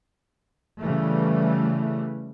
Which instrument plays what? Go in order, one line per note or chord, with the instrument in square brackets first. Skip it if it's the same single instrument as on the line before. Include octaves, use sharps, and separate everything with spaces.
[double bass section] C#3 E3 G3 A3